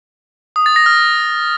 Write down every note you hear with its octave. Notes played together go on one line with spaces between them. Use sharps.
D#6
A6
A#6
F6